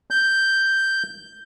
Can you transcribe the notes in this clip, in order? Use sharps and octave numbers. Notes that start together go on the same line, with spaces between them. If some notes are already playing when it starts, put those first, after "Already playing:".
G6